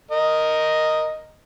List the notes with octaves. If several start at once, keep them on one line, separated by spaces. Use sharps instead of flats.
A#4 D#5